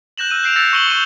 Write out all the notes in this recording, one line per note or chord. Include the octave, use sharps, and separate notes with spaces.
F#6 G6 A#6 E7 F#7
E6 D#7
F#6 G6 C7 D7 E7 F7
E6 A6 A#6 C#7
C#6 C#7 D#7 E7 F#7 G7
C#6 E6 G6 D#7 F7 F#7